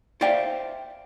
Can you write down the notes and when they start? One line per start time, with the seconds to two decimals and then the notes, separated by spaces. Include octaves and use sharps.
0.21 C5 D5 E5 F5 G5